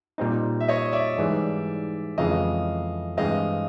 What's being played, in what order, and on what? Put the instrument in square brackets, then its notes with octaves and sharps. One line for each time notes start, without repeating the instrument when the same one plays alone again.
[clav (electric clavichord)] A#2 G3 C4 D#4
[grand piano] E5
C#5 D#5
D5 E5
[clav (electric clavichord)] G#2 E3 G3
[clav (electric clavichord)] F2 C#3 E3 G#3 [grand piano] D#5 F5
[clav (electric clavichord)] G2 E3 G#3 C4 [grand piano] D#5 F5